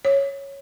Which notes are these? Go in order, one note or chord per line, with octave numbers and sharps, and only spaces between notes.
C#5